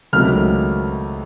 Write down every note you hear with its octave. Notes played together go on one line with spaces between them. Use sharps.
C#2 C3 D#3 F#3 A3 F6